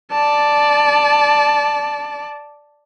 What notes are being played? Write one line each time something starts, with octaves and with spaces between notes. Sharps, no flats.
D5 A5